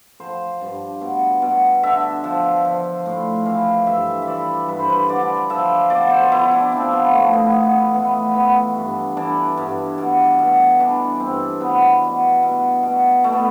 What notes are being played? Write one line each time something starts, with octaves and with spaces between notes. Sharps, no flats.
F3 C5
G2
B2
B2
D3 E5
F3
F3
A2
E3 F5
G2 E5
E5
E3 D5
G2 B4
C5
B4
D3 D5
F3 E5
B2 D5
C5
B2 E4
D4
F3 C4
B3
A2 A3
B3
E3 B3
A2 B3
E3 B3
G2
E3 D4
G2
B2
B2
E3 D4
G2 C4
B2 B3
B2
B2
B2
B2 A3
B3